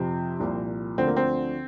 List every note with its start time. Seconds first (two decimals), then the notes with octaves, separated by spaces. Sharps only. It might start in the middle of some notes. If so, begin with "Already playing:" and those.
Already playing: F2 C3 F3 C4
0.40 C2 A#2 F3
0.98 D2 D3 F3 C4
1.07 A#3
1.16 C4